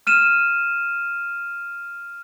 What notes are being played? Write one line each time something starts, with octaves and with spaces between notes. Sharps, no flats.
F6 D#7 E7